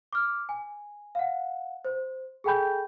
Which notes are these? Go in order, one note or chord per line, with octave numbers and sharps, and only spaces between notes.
D6 F6
G#5
F5 F#5
C5
G#4 A4 G5 G#5 B5 G6